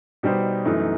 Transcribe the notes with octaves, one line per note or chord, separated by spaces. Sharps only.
B2 G3 D#4 G4 C5
F#2 E3 A3 D#4